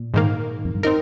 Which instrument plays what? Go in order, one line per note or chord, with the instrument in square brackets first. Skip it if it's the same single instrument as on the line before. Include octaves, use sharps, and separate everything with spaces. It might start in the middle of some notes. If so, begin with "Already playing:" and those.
Already playing: [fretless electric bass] A#2
[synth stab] G#2 D#3 A#3
[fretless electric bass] F2
G2
[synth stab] C4 D#4 A#4